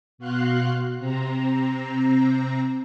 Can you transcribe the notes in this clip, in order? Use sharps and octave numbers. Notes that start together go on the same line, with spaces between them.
B2 F#4 F5 C6 F#6
C3 C4 A#5